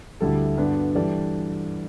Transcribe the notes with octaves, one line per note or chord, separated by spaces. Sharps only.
D2 D3 G3 E4 A4
G2 D3 B3 D4 B4
E3 G3 D4 A4 D5